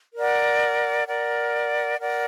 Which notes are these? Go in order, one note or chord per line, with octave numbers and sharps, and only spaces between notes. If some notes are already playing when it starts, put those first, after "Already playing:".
A#4 D5 F#5
A#4 D5 F#5
A#4 D5 F#5